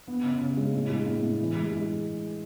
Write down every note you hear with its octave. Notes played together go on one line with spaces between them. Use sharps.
B3
C#3
C#3
G#3
A2
G#3
A2
A2
E3
G#3
G#3